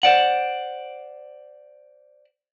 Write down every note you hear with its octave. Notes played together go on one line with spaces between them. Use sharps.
C5 D5 F#5